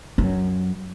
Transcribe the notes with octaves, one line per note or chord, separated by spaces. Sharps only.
F#2 F#3